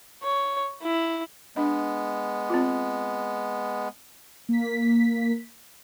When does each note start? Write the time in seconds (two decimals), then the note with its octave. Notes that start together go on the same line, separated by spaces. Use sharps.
0.23 C#5
0.82 E4
1.56 G#3 B3 D4 D#5
2.50 C4 F4
4.49 A#3 B6